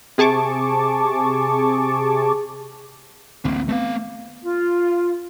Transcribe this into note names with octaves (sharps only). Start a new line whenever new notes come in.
C3 G#4 A5 C#6 D6
A1 D2 A#3 C4
A3 B3 C4 F5
F4